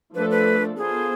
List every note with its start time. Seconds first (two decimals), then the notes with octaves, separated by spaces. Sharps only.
0.15 F3 A3 D4 A4 B4
0.30 B4
0.77 B3 F4 G#4 A4 C5